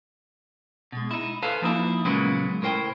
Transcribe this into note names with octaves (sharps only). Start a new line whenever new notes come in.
B2 G#3
D#4 E4
A4 B4 C5 F5 G#5 A5
F3 A#3 D#4 E4
A#2 C#3 F#3 G#3 A#3 B3
A2 A#4 C5 G5